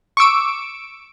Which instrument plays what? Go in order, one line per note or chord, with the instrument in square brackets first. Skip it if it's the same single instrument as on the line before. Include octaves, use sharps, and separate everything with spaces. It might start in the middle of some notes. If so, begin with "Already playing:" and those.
[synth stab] C#6 D6 E6 D7